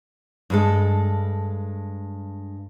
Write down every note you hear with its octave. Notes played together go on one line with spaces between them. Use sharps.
G2 G#3 A4